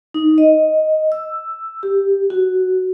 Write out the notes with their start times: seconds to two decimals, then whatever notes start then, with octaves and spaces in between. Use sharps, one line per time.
0.14 D#4
0.38 D#5
1.12 E6
1.83 G4
2.30 F#4